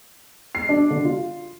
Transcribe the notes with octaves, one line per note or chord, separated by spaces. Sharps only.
C7
D4
D3
F4